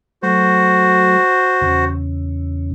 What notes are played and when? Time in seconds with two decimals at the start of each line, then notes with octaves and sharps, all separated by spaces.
0.23 F#3 A3 F#4 C5
1.61 E2 C#3